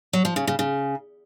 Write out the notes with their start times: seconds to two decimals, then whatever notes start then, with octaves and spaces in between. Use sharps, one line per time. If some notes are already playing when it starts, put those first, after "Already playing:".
0.13 F#3
0.25 F3
0.36 C#3
0.47 C#3
0.59 C#3